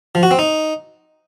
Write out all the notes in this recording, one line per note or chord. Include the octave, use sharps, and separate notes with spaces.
F3
F#4
C4
D#4